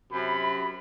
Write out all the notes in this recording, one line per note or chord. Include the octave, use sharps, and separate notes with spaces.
F#2 C3 B5